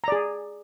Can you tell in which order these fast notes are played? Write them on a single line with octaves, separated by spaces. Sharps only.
A#5 D5 G#4